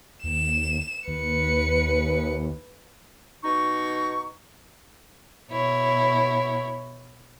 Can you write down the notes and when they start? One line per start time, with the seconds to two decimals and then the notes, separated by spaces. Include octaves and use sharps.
0.24 D#2 E7
1.08 D#2 B4 C#7
3.43 B2 D#4 C#6
5.50 B2 E4 C#5